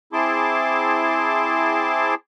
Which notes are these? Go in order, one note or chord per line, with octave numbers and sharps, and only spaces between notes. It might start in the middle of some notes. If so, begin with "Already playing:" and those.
C4 E4 G#4 A5 C6 D6